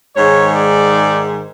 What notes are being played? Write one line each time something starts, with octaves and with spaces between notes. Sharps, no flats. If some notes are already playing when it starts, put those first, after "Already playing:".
G#2 D#3 G#3 C#5
D5